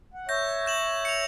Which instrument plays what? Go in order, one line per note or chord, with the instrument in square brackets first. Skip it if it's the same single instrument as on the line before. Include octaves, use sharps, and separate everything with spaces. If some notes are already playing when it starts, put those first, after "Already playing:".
[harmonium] F#5
[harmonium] C#5 E5 [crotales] G6 A#6
[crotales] G6 E7 F#7
C#7 F7